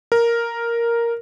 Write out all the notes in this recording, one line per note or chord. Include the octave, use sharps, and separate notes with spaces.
A#4